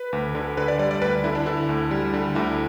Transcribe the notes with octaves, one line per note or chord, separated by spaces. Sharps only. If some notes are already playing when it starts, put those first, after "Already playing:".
Already playing: B4
D2
D3
D3 B4
D5
G3 D5
D5
D2 B4
D3 E4
D4
D3 E4
D2
G3
D3
D2 E4